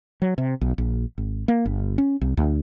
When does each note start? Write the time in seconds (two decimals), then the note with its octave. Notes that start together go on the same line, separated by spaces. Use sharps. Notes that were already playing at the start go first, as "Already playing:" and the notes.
0.22 F#3
0.38 C3
0.61 B1
0.78 A#1
1.18 G#1
1.48 A#3
1.66 G1
1.98 C#4
2.21 C2
2.37 D2